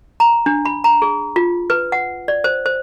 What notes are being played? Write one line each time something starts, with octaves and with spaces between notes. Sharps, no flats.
A#5
D4
B5
A#5
G#4
F4
B4
F#5
D5
C5
C5